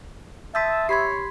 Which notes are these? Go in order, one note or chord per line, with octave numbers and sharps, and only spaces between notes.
E5 A5 C6 D#6 E6 G6 B6
G4 C#5 B5 C6 G#6 B6 C7